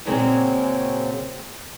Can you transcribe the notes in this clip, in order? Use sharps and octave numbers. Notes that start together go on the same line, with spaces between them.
A#2 C#3 F#3 G#3 A#3 C4